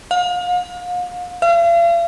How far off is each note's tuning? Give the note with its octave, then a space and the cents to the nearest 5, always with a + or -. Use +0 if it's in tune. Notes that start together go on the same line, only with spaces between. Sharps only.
F5 +40
F5 -40